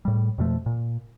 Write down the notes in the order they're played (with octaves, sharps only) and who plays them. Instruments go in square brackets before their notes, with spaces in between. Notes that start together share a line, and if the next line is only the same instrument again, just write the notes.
[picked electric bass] A2 G3
F2 B2 F3 A3
A#2